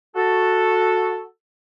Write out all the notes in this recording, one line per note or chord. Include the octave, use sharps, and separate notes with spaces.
F#4 A4